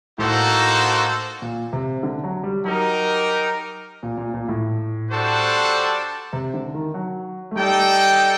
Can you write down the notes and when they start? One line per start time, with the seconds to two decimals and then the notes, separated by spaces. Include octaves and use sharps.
0.18 A2 A#3 D#4 F#4 A4 C5
1.42 A#2
1.73 C3
2.03 D3
2.24 F#3
2.43 G3
2.64 F#3 D#4 G4 A#4
4.03 A#2
4.17 A#2
4.34 A#2
4.48 A2
5.10 G3 D4 F#4 A4 C5
6.33 C3
6.54 D3
6.74 D#3
6.94 F#3
7.51 A3
7.55 G3 D#4 A4 D5 G5